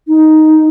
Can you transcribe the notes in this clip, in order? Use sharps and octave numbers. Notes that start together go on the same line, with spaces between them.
D#4